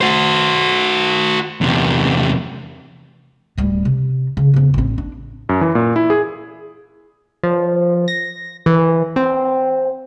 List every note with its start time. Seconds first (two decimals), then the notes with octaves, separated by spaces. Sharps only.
0.01 F#4 C5
1.61 E2 C3
3.58 D1 G3
3.85 C3
4.37 C#3
4.54 E2 C#3
4.74 A1 C4
4.98 D4
5.49 F#2
5.61 E3
5.75 A#2
5.96 E4
6.10 G#4
7.43 F3
8.08 A#6
8.66 E3
9.16 C4